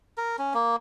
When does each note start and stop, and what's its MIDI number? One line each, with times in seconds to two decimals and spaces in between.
0.18 0.36 70
0.39 0.53 61
0.54 0.76 58